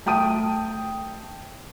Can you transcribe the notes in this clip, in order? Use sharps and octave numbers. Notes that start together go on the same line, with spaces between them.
A3 G5 A5 D#6 D7 D#7